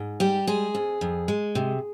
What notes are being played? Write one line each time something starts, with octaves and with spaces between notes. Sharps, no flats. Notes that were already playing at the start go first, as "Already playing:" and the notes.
Already playing: G#2
G3 G4
G#3 G#4
F2
F2
G#3
C3